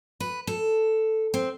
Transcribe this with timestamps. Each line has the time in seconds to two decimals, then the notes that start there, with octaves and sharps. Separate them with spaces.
0.20 B4
0.47 A4
1.34 C4